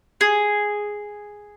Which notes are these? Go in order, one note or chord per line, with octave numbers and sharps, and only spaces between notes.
G#4